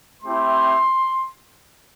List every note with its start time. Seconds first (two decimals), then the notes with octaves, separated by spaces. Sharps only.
0.22 A3 C4 E4 G4 C6